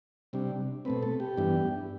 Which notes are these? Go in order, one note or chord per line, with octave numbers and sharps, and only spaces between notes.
C3 G3 D4
B2 A3 C4 B4
A4
G4
G2 E3 B3 D4